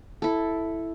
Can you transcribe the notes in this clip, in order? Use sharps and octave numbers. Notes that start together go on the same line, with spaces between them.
E4 A4